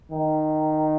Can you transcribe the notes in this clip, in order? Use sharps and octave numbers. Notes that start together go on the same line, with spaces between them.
D#3